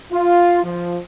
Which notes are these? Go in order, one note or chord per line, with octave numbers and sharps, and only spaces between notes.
F4
F3